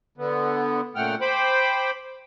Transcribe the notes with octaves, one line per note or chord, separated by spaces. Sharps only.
D3 B3
A#2 C#3 A3 F#5 G5 F6
C5 G5 B5 D6